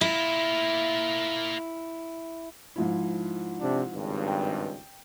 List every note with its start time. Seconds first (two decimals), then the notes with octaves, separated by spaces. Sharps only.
0.01 A#3 E4 F4
2.76 G#2 F3 E4
3.61 C3 D4
3.92 G#1 C#2 G2
4.27 G5